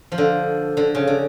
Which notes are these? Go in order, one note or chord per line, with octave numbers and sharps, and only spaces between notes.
F3
D3
D3
C#3
D3